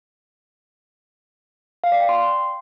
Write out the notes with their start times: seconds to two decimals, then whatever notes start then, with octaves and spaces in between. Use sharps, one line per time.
1.84 F5
1.92 D5
2.00 G5
2.09 C6